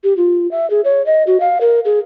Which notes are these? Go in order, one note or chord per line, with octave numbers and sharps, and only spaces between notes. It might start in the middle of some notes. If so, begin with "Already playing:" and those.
G4
F4
E5
G#4
C#5
D#5
F#4
F5
A#4
G#4